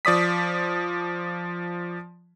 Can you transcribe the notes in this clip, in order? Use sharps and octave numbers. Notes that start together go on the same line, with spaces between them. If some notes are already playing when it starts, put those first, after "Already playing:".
F3 D5 D#6 B6